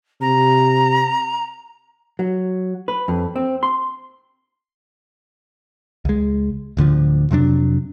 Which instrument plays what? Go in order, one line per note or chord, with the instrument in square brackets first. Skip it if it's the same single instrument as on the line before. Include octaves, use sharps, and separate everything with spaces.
[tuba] C3 [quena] A#5
[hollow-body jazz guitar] F#3
B4
F2
C4
C6
[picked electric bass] C#2 G#3
D1 D2 D3 F3
F2 C3 F#3 D4